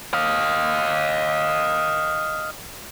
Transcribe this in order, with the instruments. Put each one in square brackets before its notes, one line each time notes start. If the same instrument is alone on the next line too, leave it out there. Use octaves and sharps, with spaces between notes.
[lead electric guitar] D#5 F5